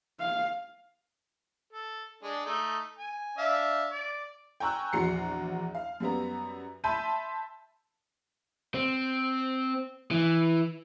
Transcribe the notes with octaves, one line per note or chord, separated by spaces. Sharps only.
F5
A4
G#3 D4
A3 D#4
G#5
D4 E5 F5
D5
G5 G#5 A#5 C#6 E6 F#6
A#1 E2 F#4 A#5 C7 C#7
F5
F#2 G3 B3 A#5
E5 A5 B5 C6 G6 D#7
C4
E3